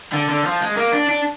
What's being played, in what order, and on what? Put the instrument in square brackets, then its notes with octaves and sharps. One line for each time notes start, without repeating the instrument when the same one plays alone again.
[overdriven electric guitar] D3
D3
F3
G#3
A#3
D4
D4